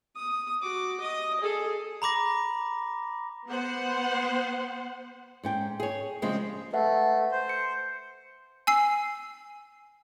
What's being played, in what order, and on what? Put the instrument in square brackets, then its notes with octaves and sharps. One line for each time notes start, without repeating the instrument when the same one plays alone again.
[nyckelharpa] D#6
F#4 D6
D#5 D#6
G#4 A4
[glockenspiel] A#5 B5 D6 A#6
[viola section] B3 C5 F#5
[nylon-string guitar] G#2 C#4 G5
G#4 C#5
C#3 F3 G3 G#3 C4 C#4
[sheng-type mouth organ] A3 [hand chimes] B4 E5 F#5
[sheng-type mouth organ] C5
[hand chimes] C#7
[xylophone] G#5 E6 C7